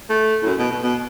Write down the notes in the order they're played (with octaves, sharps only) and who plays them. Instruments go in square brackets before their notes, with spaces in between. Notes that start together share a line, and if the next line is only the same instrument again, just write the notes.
[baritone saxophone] A3
A2
F#2
B2
B2
B2